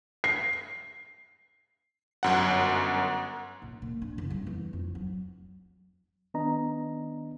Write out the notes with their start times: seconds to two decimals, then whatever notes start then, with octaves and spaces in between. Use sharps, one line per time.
0.24 C7
2.23 G1 F#2 F#5
3.62 A#1
3.82 A#2
4.02 D4
4.18 F#1
4.30 G3
4.47 E2
4.73 F2
4.95 F#3
6.34 D#3 B3 D4 D#5 A#5